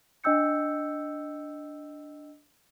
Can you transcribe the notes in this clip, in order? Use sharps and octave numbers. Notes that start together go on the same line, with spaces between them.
D4 D#5 G5 E6 G6 C#7